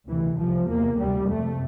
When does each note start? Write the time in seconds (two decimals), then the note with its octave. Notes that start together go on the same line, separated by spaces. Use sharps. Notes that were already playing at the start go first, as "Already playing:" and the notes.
0.09 D2 C3 E3
0.38 C2 C3 F3
0.68 E2 C3 A#3
0.98 D2 C3 G3
1.28 F2 C3 A3